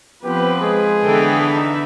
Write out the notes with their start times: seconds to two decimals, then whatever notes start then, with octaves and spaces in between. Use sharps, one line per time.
0.24 F3 B3 C4 G4 B4
0.62 G#3 G#4
1.03 D3 E3 B3 A4 G5
1.55 D#4 E5